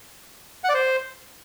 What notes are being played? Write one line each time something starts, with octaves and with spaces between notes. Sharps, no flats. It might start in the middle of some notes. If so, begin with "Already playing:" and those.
F#5
D5
C5